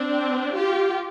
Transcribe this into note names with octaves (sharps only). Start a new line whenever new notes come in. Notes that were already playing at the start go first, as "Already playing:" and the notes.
Already playing: C4 D4
F4 G4